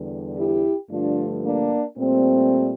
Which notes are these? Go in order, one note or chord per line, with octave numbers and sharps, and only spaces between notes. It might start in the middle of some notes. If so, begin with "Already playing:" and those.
Already playing: E2 D3 G3
E4 G4
G2 D3 F3 A3 D4 F4
A#3 D4
A#2 G3 A3 C4